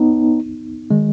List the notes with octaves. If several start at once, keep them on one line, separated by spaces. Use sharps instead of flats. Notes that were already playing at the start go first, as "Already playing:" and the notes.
Already playing: B3 D#4
D#3 G#3